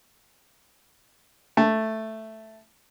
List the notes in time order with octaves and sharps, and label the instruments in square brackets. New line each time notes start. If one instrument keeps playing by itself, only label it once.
[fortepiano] A3